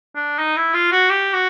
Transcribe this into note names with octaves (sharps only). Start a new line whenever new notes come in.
D4
D#4
E4
F4
F#4
G4
F#4